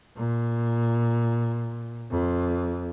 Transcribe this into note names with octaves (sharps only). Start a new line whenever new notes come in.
A#2
F2